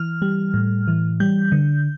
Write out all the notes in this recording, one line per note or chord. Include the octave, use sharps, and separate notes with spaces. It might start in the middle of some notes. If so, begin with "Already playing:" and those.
Already playing: E3 F6
G3
A2
E3
G3 G6
D3